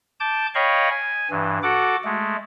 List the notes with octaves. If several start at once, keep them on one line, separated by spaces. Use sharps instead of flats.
A5 D6 G6
C#5 D#5 F5 G5 B5 C#6
G#5
G2 E3
F#4 A4 F#5 D6
G#3 A3